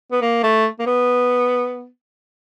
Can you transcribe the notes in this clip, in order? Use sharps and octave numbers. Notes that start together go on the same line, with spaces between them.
B3
A#3
A3
A#3
B3